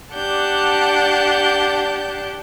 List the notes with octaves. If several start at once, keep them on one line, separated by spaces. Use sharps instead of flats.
D4 G4 F#5 A5 G6